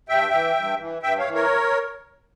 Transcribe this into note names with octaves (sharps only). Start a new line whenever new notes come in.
G2 E5 G5
E3
G2
E3
G2 E5 G5
C#5 F5
E3
A#4 C#5